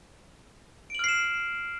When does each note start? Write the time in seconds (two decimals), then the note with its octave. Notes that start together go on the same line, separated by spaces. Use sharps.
0.90 D7
0.95 F#7
0.99 F6
1.04 C7
1.09 E7